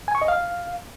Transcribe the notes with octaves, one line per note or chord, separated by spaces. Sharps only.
G#5
C#6
D#5
F5